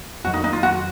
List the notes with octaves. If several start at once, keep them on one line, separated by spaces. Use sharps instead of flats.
F2 D#3 F#3 F#4
D#4
D#4
F4
F#4